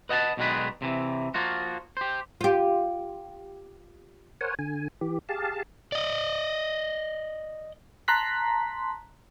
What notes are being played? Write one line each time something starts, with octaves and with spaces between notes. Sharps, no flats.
B4 D#5 F#5 G5 A5
B1 B2 D#3 G#3 D4 B4
C3 E3
F3 A#3 F4 F#4
G4 C5
F4 G4
A#4 C5 C#5 F#5 G#5
D3 G#5
E3 G4
G4 G#4 F5 A5
D5 D#5
A5 A#5 C6 F#6 B6